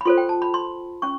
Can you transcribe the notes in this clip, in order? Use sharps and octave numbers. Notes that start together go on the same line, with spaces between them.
B5
F4 A4 C5 C6
G5
A5
B5
C6
C#4 C#6